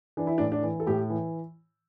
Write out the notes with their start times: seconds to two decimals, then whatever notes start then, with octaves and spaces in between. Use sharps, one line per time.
0.17 E3 D4
0.27 E4
0.38 A2 D4
0.52 D4
0.63 E3
0.80 A4
0.87 A2 G4
1.10 E3